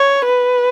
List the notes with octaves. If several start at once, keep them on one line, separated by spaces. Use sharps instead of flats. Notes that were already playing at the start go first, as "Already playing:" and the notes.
Already playing: C#5
B4